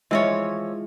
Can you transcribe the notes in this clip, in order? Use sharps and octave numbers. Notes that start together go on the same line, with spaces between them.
E3 F3 G#3 E4 F4 C#5 D#5 E5